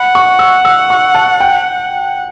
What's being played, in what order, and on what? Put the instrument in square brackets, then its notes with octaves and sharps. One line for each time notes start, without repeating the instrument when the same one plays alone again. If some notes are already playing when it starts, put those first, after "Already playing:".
Already playing: [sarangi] F#5 [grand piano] B5
[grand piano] C#6
E6
E6
C#6
A5
G5